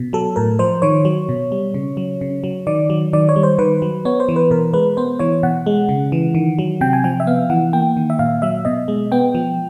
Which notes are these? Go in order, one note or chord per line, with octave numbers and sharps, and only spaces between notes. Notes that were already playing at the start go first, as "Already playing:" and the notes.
Already playing: B2
F#3 A4
A2 A#4
F3 C5
D#3 C#5
F#3
B2
G3
C#3
F#3
C#3
F#3
D#3 D5
F#3
D#3 D5
C#5
G3
C5
D#3 B4
F#3
B3 C#5
C5
E3
B4
B2 A#4
G#3 B4
B3 C5
E3 C#5
B2 F#5
G#3
C#3
E3
D#3
F#3
C3 G5
G#5
F3 G5
E5
B3 F5
E3 F#5
A#3 G5
D#3
E5
A#2 F5
F#3 E5
B2 D#5
G#3
B3 G5
F3